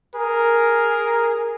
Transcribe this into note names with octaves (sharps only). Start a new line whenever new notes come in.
G#4 A#4